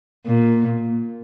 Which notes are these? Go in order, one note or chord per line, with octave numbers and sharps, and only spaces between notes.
A#2